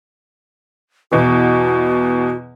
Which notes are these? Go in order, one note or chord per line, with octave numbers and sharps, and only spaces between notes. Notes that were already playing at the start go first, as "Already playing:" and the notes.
E2 B2 E3 F#4